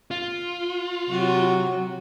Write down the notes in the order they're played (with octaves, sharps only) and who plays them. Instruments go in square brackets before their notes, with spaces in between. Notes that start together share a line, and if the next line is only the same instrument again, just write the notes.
[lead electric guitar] F4
[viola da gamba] C3 F#4 [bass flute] F#3